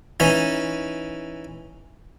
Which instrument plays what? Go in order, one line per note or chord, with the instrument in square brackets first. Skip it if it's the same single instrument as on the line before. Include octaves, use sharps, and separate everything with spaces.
[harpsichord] E3 C#4 D#4